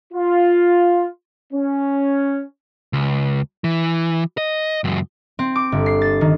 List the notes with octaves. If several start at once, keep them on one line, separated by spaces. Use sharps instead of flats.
F4
C#4
C#2
E3
D#5
C#2 F#2
C4
D6
G1
C7
A6
D#3